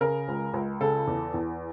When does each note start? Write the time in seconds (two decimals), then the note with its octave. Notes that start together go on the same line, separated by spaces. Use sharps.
0.01 C#3 A#4
0.28 C#2
0.54 C#2
0.81 C#3 A4
1.07 E2
1.34 E2